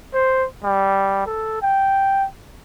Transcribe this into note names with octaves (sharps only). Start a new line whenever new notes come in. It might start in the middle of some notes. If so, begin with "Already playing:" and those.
C5
G3
A4
G5